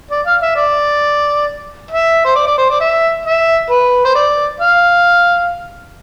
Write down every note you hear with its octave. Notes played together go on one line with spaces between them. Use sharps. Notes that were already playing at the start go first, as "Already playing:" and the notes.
D5
F5
E5
D5
E5
C5
D5
D5
C5
D5
E5
E5
B4
C5
D5
F5